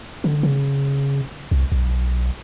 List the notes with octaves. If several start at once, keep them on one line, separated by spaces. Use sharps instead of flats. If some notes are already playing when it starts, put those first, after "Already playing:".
D3
C#3
C2
B1